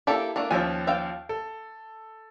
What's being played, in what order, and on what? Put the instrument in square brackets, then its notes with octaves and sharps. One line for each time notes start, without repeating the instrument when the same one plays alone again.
[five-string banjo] A#3 G4 A4 [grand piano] E4 E5
[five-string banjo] A3 A#3 D4
[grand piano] D#2 F3 C#4 [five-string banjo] E5 G#5
[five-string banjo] E5 F5 G5
[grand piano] A4